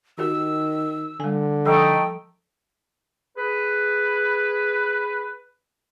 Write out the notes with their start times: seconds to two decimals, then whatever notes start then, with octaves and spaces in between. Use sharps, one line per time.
0.18 D#3 F#4 G4 A#4 E6
1.20 D3 G3 G#5
1.66 F3 A3 D#4 A4 G5
3.36 G#4 B4